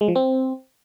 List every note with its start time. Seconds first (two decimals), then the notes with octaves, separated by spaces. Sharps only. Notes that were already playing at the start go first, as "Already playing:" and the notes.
0.01 G#3
0.08 F3
0.16 C4